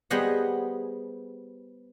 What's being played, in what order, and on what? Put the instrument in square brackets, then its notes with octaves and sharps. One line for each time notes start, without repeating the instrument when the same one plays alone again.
[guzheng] G3 B3 G#4 C5 D#5 F#5